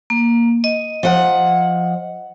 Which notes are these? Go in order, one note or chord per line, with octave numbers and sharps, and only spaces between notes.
A#3
D#5
F3 F#5